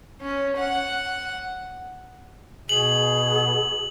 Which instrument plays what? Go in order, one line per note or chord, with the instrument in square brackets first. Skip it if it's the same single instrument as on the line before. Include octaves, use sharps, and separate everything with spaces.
[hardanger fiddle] C#4
F#5
[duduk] B2 [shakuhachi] G#4 [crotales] F#7